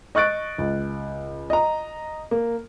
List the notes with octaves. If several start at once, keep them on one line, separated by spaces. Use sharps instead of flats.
D#5 C#6 F#6 A6 D7
C#2
D#5 A#5
A#3